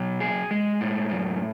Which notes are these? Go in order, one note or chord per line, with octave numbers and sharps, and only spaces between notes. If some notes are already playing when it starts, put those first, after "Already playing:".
Already playing: B2 F#3
G#4
G#3
A2
F#2